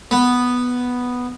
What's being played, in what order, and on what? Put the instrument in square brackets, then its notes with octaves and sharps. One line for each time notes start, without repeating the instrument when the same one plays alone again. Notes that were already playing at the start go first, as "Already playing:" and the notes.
[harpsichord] B3